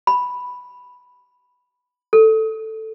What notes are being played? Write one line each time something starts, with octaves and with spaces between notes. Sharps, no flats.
B5
A4